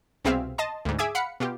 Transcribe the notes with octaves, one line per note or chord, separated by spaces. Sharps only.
C2 B2 C4 G#4 E5 F5
D#5 A5 C6
D2 G#2
G#4 E5 G#5 D6 G#6
F5 F#5 B5 C#7
B2 F4 G4